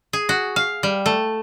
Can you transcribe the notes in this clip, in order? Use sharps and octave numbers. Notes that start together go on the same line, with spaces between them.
G#4
F#4
F5
G3
A3